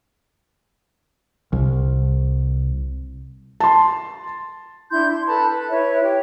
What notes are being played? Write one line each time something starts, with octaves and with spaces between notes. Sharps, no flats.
C2
A5 C6
D4 E4 C6 G6
C6
A4 B4 A5 B5
B4
E4 B4 C#5 E5
G4 C#5